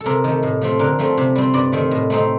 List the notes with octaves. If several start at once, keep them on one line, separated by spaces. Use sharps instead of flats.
A4
C3 A#4
D#3 A3
A2
F3 A3 C4
D3 A#4
F3 A3 C4
C3
G3 C4
G2 D5
D#3 A3 C4
A2
A3 C4 D#4